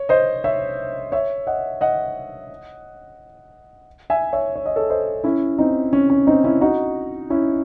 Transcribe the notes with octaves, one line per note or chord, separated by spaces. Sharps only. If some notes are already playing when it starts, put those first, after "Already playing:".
Already playing: C#5
C5 D#5
C#5 E5
C#5 E5
D#5 F#5
D#5 F#5
E5 G#5
C#5 E5
C#5
D#5
A4 C#5
C5 D#5
C#4 E4
C4 D#4
C#4
C#4
C4 D#4
C#4 E4
D#4 F#4
C#4 E4